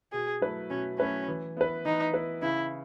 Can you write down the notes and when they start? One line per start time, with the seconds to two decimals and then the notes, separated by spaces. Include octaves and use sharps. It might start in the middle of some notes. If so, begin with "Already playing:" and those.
0.13 B2 G#4
0.41 F#3 A3 E4 B4
0.70 B2 C#4
0.99 F#3 A3 C#4 E4 B4
1.28 E3
1.57 B3 E4 B4
1.85 E3 D#4
2.14 B3 E4 B4
2.42 C#3 E4